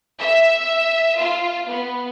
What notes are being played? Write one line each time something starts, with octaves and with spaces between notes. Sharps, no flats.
E5
F4
B3